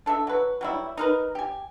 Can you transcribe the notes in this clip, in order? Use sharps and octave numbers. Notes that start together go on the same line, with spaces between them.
D4 A4 D5 E5
F#3 B4
F#3 G3 E4
D#4 A#4 B4
G4 G#5